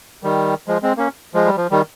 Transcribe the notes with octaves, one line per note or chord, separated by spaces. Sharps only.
D#3 G3
F3 G#3
G#3 C4
A#3 C#4
F3 G#3
G3
F3
D#3 G3